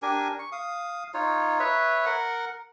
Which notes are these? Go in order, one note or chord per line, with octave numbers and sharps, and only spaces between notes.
D4 G4 A#4 G#5
C#6
F5 D#6
D#4 F4 C#5
B4 C#5 E5
A#4 F#5